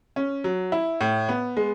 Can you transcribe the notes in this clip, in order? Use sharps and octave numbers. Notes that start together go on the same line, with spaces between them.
C#4
F#3
E4
A2
B3
G#3